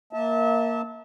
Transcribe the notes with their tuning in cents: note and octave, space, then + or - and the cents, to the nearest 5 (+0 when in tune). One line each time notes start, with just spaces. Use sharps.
A#3 +0 E5 -35 A5 +0